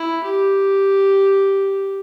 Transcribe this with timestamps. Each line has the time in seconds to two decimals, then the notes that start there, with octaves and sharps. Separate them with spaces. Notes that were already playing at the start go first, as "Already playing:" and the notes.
Already playing: E4
0.24 G4